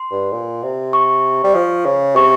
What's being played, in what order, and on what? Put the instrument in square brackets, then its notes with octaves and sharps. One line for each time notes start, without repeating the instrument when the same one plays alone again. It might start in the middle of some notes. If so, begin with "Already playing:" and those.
Already playing: [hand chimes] C6
[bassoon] G2
A#2
C3
[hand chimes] C#6
[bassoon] G3
F3
C#3
[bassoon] C3 [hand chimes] C#6